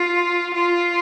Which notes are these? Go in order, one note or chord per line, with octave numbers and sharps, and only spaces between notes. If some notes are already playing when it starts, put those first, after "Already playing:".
Already playing: F4
F4